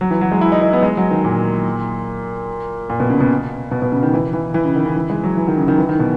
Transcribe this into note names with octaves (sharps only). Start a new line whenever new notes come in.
F#3
E3
F#3
G#3
E4
D#4
D#4
B3
G#3
F#3
D#3
A#2
A#2
B2
C#3
B2
B2
B2
C#3
D#3
E3
E3
E3
C#3
D#3
C#3
E3
G#3
F#3
E3
D#3
C#3
D#3
E3
D#3
B2